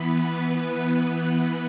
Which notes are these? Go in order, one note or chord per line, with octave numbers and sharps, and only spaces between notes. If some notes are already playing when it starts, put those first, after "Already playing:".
Already playing: E3 B3 B4